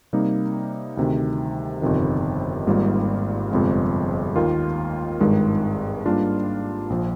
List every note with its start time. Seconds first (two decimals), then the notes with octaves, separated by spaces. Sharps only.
0.13 C3 G3 A#3 D#4
0.97 D2 C3 D#3
1.82 G1 F2 C3 D#3
2.67 G#1 G#2 G3 A#3 F4
3.51 G1 F2 C3 F3 G#3
4.36 D#2 D#3 A#3 F4
5.20 G#1 G2 D#3 G#3
6.06 G#2 G3 A#3 D4 F4
6.90 A#1 F3